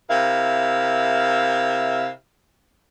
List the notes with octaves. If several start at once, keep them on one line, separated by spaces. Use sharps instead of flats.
C3 E4 A#4 F5